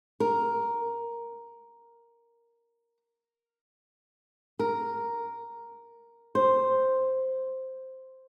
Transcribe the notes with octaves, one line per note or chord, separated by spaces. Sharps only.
A#4
A#4
C5